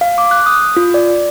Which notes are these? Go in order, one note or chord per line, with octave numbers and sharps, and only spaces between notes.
F5
D6
F#6
D#6
F4
D5